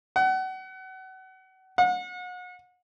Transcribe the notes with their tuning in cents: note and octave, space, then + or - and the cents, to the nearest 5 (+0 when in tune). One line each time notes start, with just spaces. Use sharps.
F#5 +30
F#5 -35